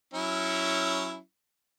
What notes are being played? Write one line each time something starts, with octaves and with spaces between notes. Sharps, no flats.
F#3 C#4 E4